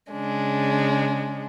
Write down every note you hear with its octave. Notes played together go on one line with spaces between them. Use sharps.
C#3 G#3 D4